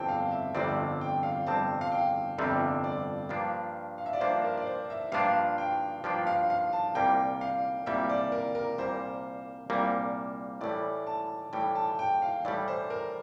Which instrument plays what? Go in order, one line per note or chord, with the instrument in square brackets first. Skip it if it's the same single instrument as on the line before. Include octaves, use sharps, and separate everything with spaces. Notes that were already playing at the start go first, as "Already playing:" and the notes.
Already playing: [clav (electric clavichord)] G1 F2 C3 G3 C4 [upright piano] G5 A5
[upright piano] F5
E5
[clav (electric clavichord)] G1 F2 C3 G3 C4 [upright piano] D5
[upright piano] G5
F5
[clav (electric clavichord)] G1 F2 C3 G3 C4 [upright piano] A5
[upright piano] F5
G5
[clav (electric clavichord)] G1 F2 C3 G3 C4 [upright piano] E5
[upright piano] D5
[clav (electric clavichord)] G2 F3 A#3 D4 F4
[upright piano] F5
E5
D5
[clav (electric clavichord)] G2 F3 A#3 D4 F4 [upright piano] C5
[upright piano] A#4
D5
C5
E5
[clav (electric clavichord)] G2 F3 A#3 D4 F4 [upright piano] F5
[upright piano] G5
[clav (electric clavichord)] G2 F3 A#3 D4 F4 [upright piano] G5
[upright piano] F5
F5
A5
[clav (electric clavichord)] C2 A#2 G3 A#3 [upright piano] G5
[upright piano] F5
[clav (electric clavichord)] C2 A#2 G3 A#3 [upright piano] E5
[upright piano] D5
A#4
A#4
[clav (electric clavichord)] C2 A#2 G3 A#3 [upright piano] C5
[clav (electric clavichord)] C2 A#2 G3 A#3
[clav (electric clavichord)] A2 E3 G3 [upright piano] D5
[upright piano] A5
[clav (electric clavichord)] A2 E3 G3 [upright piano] G5
[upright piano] A5
G5
F5
[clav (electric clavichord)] A2 E3 G3 [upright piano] D5
[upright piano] C5
A#4